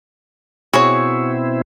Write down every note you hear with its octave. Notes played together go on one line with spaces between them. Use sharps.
B2 C4 E4 F#4 G#4 C#5